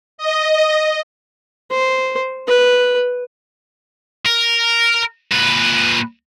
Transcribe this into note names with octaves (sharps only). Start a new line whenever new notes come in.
D#5
C5
B4
A#4
A#2 B4